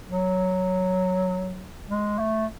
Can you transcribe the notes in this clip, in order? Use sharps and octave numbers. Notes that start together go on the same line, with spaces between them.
F#3
G#3
A3